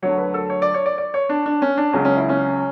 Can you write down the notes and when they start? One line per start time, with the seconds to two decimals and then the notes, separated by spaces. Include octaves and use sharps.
0.02 D2 D3 F#3 C#5
0.18 B4
0.34 A4
0.50 C#5
0.62 D5
0.74 C#5
0.86 D5
0.98 D5
1.14 C#5
1.29 D4
1.46 D4
1.62 C#4
1.77 D4
1.93 C#2 C#3 F#3 C#4
2.05 C#4
2.17 E4
2.29 C#4